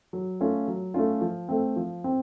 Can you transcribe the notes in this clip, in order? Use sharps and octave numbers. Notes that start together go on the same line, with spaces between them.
F#3
A3 C#4 F4
F#3
A3 C#4 F4
F3
A3 C4
F3
C4